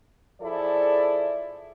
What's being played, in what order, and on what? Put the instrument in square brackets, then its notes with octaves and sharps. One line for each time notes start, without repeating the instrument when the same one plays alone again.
[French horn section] F3 E4 G#4 A4 D5